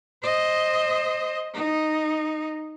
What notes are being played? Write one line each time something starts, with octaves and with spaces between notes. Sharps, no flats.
C5 D#5
D#4